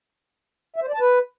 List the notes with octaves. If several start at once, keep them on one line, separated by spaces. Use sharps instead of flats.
E5
C5
D5
A5
B4